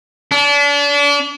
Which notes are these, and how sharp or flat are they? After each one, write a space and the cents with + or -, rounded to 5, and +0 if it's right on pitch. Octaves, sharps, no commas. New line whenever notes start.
D4 -35